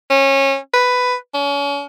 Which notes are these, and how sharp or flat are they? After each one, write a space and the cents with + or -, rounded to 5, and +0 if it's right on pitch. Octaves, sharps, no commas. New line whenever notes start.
C#4 -25
B4 +10
C#4 +35